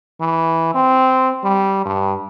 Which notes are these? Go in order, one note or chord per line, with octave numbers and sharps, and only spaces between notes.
E3
C4
G3
G2